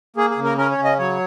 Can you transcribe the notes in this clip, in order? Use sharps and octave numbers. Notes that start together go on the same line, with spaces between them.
A#3 G#4
G#4
C#3
A#4
C#4 A#4
C#5
C#3
D#5
F#3 C#5